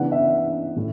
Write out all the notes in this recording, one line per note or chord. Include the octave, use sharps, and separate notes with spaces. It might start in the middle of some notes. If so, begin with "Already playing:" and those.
Already playing: C#3 E3 B3 D4 F#5
E5
A2